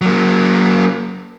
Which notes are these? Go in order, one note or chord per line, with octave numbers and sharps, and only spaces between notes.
F#3 A#3